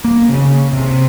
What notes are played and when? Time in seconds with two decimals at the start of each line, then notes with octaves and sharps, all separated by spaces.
0.04 A#3
0.29 C#3
0.73 C3